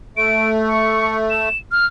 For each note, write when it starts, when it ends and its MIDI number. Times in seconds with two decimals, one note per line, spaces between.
0.17 1.49 57
0.17 0.50 98
0.68 1.16 85
1.30 1.57 100
1.72 1.86 89